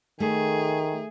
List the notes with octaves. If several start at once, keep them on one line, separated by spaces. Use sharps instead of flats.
D#3 A3 G#4